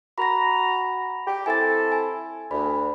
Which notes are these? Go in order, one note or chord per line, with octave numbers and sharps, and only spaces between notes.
F#4 A#5 B5 A#6
G4
C4 E4 A4 G#5 A6
G#5
D2 B5